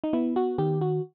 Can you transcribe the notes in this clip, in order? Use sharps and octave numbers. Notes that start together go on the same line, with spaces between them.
D#4
B3 E4
F#4
D#3 G4
F#4